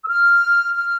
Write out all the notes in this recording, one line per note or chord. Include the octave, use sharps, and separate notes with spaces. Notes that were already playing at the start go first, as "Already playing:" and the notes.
E6
F6
F6